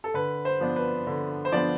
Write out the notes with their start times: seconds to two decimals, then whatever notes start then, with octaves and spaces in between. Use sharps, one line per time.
0.04 A4
0.14 D3 B4
0.45 C5
0.60 F3 B3 D4
0.76 B4
1.07 D3
1.45 C5
1.52 F3 B3 D4 D5